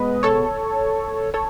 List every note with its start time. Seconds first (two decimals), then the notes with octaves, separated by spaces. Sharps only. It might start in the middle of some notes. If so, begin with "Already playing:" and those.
Already playing: B2 G#3 B3 B4 D#5
0.23 A4 C#5
1.34 A4 C#5